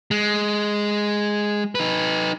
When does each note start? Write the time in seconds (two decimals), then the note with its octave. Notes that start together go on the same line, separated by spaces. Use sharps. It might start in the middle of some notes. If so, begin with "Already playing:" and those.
0.11 G#3
1.75 D#4 B4